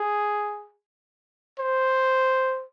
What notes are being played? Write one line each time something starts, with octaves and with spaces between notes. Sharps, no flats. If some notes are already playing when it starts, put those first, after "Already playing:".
Already playing: G#4
C5